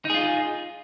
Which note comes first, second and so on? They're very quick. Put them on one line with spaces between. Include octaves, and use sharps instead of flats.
D#4 G#4 F4